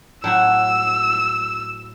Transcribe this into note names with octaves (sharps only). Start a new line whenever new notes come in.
A2 F#3 F#4 E6